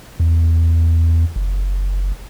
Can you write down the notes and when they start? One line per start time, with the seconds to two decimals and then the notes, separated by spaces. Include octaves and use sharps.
0.20 E2
1.36 F#1